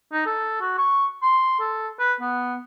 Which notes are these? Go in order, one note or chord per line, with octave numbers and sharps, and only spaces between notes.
D#4
A4
F#4
C#6
C6
A4
B4
B3